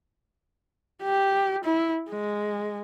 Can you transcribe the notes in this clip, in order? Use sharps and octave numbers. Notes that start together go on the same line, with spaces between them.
G4
E4
G#3